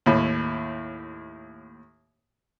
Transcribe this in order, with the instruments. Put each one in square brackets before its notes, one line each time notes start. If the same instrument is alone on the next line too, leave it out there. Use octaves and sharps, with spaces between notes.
[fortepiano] D#2 A2